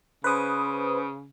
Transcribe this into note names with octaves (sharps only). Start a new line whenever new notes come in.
C#3 B4 C5 D#6